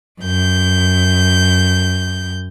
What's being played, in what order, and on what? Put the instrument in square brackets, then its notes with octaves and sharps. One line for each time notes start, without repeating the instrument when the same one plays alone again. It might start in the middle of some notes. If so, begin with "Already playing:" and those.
[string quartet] F#2 G6